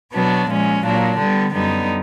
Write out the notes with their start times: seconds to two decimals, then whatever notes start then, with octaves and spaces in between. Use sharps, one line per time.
0.14 B2 F#3 B3 D4
0.49 A#2 F3 G#3 C#4
0.84 A#2 F#3 A#3 D4
1.19 D3 G3 B3
1.54 F#2 D3 G3 B3 D#4